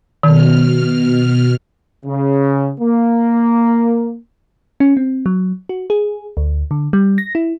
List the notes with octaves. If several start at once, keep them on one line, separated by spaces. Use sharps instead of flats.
B2 D#3 F6
C#3
A#3
C#4
C4
F#3
F#4
G#4
D2
D3
G3
A#6
E4